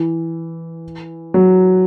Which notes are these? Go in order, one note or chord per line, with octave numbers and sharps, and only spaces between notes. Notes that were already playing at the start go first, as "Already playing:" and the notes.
Already playing: E3
F#3